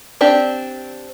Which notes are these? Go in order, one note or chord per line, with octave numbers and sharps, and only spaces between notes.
C4 D4 G4